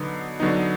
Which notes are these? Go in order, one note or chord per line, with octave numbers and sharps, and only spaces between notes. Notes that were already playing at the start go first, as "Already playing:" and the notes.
Already playing: D3 F#3 B3 D#4
D3 F#3 B3 D#4